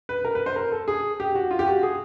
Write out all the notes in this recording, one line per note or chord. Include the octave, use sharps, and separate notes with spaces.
B4
A#4
B4
C5
A#4
A4
G#4
G4
F#4
F4
G4
F#4
G#4